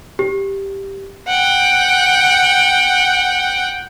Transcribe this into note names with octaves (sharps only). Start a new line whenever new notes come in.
G4
F#5 G5